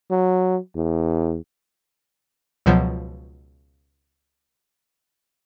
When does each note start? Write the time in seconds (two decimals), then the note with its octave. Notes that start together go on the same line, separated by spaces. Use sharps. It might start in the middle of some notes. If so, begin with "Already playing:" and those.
0.11 F#3
0.75 E2
2.66 C#2 B2 F3 F#3